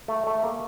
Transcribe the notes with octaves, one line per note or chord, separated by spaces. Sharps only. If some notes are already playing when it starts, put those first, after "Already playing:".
A3
A3
A#3